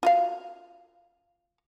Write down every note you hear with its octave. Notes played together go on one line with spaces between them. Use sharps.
F4 F#4 F5